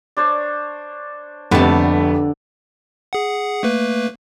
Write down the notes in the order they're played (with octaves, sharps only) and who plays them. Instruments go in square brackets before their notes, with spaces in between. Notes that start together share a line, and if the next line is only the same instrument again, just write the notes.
[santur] D4 C5 C#5
[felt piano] F1 F2 [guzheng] D3 A5 [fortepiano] G3 A3 B3
[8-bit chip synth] G#4 F#5
A3 A#3 B4